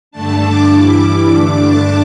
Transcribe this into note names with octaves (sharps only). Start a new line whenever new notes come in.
G2 D3 A3 D4 A5
D6
G2 E3 G3 E4 D6
G2 D3 A3 D4
A5